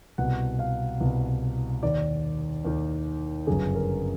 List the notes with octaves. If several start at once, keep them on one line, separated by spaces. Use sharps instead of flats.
C2 B2 F#5
F5
C2 B2
D#2 D#3 D5
D#2 D#3
G1 F#2 C#3 G#4
A#4